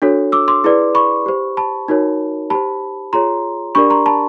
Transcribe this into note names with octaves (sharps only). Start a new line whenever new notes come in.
D4 F#4 A4 C#5
D6 E6
C6 D6
E4 G#4 B4 D5
B5 C#6
G4 C5
A5 B5
D#4 F#4 A#4 C#5
G4 C5 A5 B5
F4 G#4 C#5 A#5 C6
D4 G4 A#4 D5 B5 C#6
A#5 C6
A5 B5